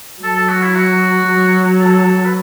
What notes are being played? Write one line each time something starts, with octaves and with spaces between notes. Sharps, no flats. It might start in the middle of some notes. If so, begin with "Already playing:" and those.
F#3 A4
A4
F#4
E4
F#4
F#3
A4
B4